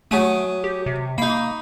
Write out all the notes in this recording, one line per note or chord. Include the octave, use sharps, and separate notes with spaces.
F#3 A3 G#5 D#6
G4
C3
A#3 D#4 B5